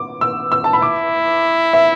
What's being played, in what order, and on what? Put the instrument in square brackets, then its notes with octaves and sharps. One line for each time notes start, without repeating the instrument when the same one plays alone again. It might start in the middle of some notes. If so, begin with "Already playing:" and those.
Already playing: [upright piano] D6
E6
E6
A5
B5
[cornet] E4 [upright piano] D6
[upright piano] E5